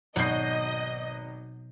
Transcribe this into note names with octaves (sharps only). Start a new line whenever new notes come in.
G#1 B2 F#3 D#5 G6 C7